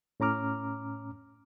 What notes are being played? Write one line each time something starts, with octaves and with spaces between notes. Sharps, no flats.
A2 C#4 A#5 D6 F6